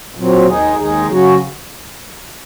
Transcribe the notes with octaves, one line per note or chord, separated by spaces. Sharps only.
A#2 F#3 C4
D#2 D#3 G#3 D#4 G#4
D#2 D#3 G#3 D#4 G#4
C#3 F#3 C#4 F#4